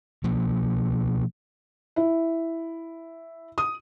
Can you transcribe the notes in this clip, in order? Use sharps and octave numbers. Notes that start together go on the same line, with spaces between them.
B2 F3 A#3
E4
D#6